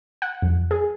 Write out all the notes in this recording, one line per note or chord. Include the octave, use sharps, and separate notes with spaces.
F#5
F2
G#4